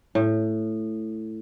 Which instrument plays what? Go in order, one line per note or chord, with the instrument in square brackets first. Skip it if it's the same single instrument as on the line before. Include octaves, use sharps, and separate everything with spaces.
[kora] A2